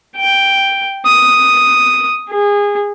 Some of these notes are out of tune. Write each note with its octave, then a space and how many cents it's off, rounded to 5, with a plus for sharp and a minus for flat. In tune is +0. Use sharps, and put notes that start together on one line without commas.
G5 +0
D#6 +0
G#4 -25